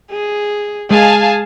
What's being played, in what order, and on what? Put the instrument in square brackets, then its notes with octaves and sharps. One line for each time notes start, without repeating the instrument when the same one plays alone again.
[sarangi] G#4
[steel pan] G#3 [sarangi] G#4 [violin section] F5 G#5 A5